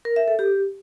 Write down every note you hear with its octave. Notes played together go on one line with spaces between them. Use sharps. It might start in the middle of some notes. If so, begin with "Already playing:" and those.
A#4
E5
A4
G4